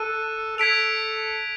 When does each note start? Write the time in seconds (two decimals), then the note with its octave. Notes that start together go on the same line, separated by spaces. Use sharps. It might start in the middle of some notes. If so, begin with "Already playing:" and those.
Already playing: A4 F#6 D#7
0.58 A4 G#6 B6 D7 F7